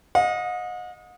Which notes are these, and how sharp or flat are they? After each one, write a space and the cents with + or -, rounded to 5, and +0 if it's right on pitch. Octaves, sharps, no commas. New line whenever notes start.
D#5 +0 F#5 -45